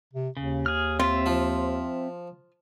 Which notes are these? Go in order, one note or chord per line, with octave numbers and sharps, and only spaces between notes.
C3
D#2 C#3
G#4 F6
C4 F4 E5
F3